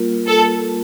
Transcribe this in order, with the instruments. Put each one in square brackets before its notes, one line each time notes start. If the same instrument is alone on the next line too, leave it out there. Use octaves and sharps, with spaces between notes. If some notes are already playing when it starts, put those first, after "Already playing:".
Already playing: [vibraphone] G3 A#3 F4 A#4
[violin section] A4